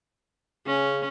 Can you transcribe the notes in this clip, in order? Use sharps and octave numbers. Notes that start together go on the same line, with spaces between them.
C#3 C#4